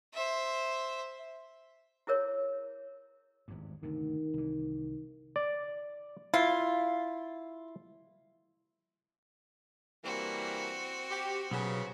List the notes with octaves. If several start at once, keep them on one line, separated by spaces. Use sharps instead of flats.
C5 E5
E4 G#4 A#4 C#5
G#1 E2 G2
D2 G2 C3 D#3
C2 E3
D5
E4 F4
E3 G3 A#3 C4 F#4
G4
B1 C#3 B3